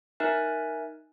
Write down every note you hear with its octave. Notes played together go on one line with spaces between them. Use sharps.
D#4 A#4 E5 G#5 F#6